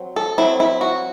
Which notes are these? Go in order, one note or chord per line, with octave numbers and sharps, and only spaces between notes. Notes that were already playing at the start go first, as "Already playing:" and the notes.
Already playing: F#3 C4
A4
F#3 C4 E4
E4
F#4